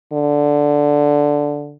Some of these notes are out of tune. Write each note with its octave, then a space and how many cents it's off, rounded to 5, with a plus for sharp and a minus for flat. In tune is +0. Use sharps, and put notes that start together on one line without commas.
D3 -5